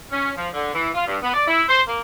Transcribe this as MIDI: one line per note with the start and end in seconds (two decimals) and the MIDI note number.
0.11 0.31 61
0.37 0.48 53
0.54 0.73 50
0.74 0.89 52
0.95 1.06 65
1.07 1.16 43
1.23 1.32 59
1.34 1.44 74
1.48 1.63 64
1.69 1.82 72
1.88 1.99 58